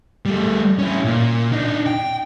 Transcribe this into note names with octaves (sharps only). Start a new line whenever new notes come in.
G3 A3
C#4 E4
A#2
D4 D#4
G5